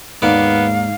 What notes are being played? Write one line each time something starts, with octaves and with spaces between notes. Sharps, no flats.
D#2 G#2 A#3 B3 D5 F5